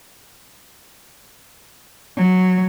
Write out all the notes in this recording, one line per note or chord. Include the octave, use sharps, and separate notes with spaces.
F#3